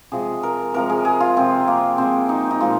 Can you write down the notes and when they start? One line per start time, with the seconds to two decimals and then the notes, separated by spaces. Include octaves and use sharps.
0.12 C3 F3 G#3 G#4
0.43 A#4
0.74 C3 F3 G#3 A#4
0.90 G#4
1.05 G#4
1.20 F4
1.36 C3 F3 G#3 C4
1.68 A#3
1.98 C3 F3 G#3 C4
2.29 D#4
2.51 D#4
2.60 A#2 F3 G#3 F4